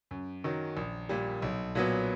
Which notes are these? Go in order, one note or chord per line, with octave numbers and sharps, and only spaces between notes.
F#2
D#3 F#3
A#1
A#2 G3
B1
A#2 F#3 B3